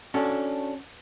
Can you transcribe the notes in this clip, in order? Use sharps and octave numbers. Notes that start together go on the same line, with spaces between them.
C#4 D4 F#4 A4